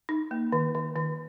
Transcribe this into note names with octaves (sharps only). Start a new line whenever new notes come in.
D#4
A#3
D#3
D#3
D#3